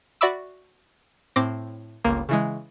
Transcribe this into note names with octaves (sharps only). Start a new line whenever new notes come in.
F#4 D5 E5 B5 D6 E6
A2 C4 D6 A#6
G1 C#2 A#3
C#3 E3 G#3